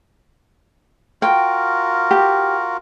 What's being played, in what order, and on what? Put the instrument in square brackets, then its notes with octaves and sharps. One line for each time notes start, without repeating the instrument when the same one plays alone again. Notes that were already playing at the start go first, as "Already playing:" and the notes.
[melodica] F4 F#4 A#4 [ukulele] G5
[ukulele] G4